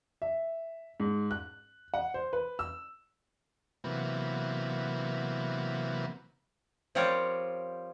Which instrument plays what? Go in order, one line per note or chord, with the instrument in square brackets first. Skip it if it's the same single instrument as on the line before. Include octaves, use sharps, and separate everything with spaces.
[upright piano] E5
G#2
F#6
F#5
C5
B4
E6
[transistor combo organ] C3 E3 F#3 A#3 B3
[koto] F3 G3 C4 A#4 C#5 D5